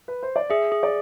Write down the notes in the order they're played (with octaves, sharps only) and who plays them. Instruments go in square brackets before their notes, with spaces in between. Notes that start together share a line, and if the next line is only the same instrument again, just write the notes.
[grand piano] B4
C5
D5
[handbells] G#4 [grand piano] E5
[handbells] G#4
[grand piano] D5